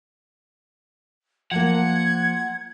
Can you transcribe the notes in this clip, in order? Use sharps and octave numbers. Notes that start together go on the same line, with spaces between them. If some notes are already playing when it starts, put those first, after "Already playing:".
F3 A#3 F#5 G#6